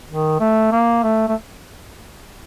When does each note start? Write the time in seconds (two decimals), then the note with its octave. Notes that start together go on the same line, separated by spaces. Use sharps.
0.09 D#3
0.40 A3
0.72 A#3
1.03 A3
1.28 A3